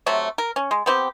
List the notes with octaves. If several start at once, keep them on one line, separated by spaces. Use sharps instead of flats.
C3 F#3 A3
A#4
C#4
G#3
B3 C4 G4